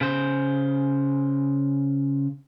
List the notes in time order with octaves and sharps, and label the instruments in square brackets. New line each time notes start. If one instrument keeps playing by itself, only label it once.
[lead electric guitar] C#3 C5